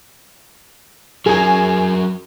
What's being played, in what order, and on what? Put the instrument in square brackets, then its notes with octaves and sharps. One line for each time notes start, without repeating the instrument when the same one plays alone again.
[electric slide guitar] F#3 A#4 [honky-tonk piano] G#4 G#5